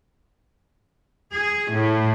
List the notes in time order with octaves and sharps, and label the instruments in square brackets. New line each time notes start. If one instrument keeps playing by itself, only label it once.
[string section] G#4
A2